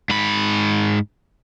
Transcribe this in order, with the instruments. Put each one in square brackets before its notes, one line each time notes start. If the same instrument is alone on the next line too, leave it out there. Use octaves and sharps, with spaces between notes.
[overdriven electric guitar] G#2 B5